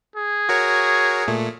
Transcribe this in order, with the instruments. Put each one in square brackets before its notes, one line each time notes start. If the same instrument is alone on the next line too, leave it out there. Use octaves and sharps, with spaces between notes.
[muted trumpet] G#4
[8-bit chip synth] F#4 A#4 C#5
A#2 A3